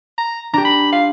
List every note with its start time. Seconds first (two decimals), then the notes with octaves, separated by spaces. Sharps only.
0.18 A#5
0.53 D4 G4 A#5
0.65 B5
0.93 F5